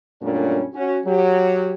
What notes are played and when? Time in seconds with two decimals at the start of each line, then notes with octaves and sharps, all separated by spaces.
0.22 F#2 A#2 G3 A3 C#4 D4
0.74 C#4 F#4
1.05 F#3 G4